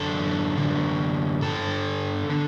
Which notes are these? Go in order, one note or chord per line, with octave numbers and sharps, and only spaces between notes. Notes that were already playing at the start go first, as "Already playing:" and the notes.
Already playing: F#2 D3 A4
F#2 D3
G2 D3 A4
D3